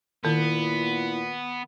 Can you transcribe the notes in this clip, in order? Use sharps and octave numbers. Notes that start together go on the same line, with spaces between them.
A#2 D#3 B3 E4